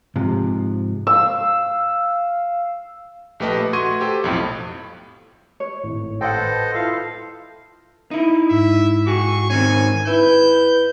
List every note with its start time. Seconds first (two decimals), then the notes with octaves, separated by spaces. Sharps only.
0.16 G#2 C3 F3
1.07 F5 E6
3.40 A#1 A3 G4 B4 D#5 A5
3.73 A3 F#4 C6 C#6 G#6 D#7
4.01 G4 A4 C5
4.24 B1 F2 A2
5.60 C#5
5.84 G#1 A2
6.21 A4 C5 D#5 F#5 G5
6.38 B4 A5
6.75 E4 F4 A4 F5
8.11 D#4 E4
8.50 G#2 E5
9.07 F#4 G#4 C#6
9.50 D#3 C4 C#4 G#5
10.07 E4 B4 G6